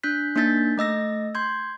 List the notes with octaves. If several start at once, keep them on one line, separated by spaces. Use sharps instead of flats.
D4 F#6 G6 B6
A#3 D4 D#4 G6 A6 B6
A3 D#5 E6 A#6
C6 G6 G#6